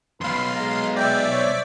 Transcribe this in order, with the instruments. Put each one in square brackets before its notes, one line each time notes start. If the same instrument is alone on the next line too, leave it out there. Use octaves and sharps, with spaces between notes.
[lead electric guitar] B1 F2 [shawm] B4 [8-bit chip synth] F5 C6
[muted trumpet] G#3 [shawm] A#5
[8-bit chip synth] D5 E5 D6 [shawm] G5
[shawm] C5 [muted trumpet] C#5